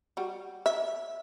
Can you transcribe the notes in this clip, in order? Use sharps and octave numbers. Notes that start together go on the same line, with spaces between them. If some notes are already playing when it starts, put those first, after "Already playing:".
G3 F#4
E5